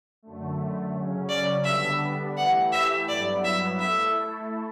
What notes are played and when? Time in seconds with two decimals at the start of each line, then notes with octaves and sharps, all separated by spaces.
0.22 F#2 D3 A3
0.94 C#3 F#3 C#4
1.29 D5
1.65 D3 G3 B3 D4 E5
2.37 E3 A3 E4 G4 F#5
2.72 E5
3.08 G2 F#3 B3 E4 D5
3.45 E5
3.79 A3 E4 A4 E5